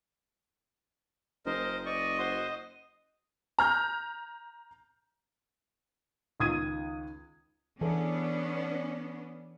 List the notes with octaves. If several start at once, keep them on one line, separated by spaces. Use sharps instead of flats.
F#1 A#4 C5 D#5
D5 D#5 C#6
F#4 C5 C6
A#5 F6 G6
C#2 D#3 D#6 G#6 D#7
E3 B3 C#4 D4 G#4 A4